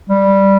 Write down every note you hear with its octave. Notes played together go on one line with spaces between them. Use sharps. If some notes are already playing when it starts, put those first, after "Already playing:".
G3